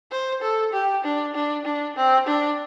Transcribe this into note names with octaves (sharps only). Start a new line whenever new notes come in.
C5
A4
G4
D4
D4
D4
C4
D4